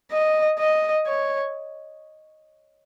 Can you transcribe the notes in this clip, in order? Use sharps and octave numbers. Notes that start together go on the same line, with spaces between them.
D#5
D#5
C#5